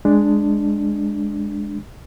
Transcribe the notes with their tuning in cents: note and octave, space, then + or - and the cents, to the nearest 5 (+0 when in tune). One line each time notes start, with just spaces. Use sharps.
G#3 +0 D4 +0